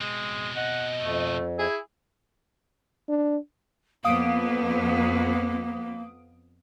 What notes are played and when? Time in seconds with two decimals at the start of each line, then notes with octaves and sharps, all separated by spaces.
0.01 B2 G#3 C4
0.56 D#5 F#5
1.03 F2 A3
1.59 E4 G#4
3.09 D4
4.05 F2 A#3 B3 F5 D#6 D7